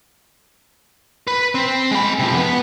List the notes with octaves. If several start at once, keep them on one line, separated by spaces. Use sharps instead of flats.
B4
C4
G#3 B5
C3 F3
B3 B4